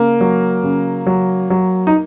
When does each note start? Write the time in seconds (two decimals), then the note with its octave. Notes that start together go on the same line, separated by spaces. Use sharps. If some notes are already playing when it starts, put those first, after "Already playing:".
Already playing: C#3 A#3
0.21 F#3
0.64 C#3
1.06 F#3
1.50 F#3
1.87 D#4